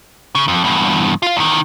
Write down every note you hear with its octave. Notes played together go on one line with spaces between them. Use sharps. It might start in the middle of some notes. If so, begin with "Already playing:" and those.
C#3
F2
E2 G2
F4 F5
E2 D#3